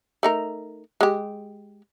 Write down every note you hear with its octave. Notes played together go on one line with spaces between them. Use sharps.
A3 D#4 A#4
G#3 G4